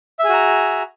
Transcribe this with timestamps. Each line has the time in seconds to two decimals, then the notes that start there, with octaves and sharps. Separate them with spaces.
0.19 E5
0.24 G#4
0.29 F#4
0.34 A#5